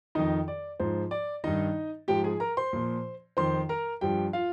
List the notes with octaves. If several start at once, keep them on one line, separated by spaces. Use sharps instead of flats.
F2 D#3 D#4 D#5
D5
G#2 F3 C5
D5
G2 D#3 D#4 D#5
G#2 F3 G4 G5
G#4 G#5
A#4 A#5
C5 C6
A#2 F3
F2 D#3 C5 C6
A#4 A#5
G2 F3 G4 G5
F4 F5